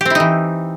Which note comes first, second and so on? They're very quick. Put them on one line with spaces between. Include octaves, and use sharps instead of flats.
G4 C4 E4 D#4 E3